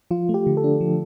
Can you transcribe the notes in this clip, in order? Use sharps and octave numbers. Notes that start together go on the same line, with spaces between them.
F3 F4
A3
G4
D3
A4
D4
F3